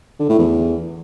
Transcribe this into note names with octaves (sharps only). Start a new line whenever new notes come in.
D3
A2
E2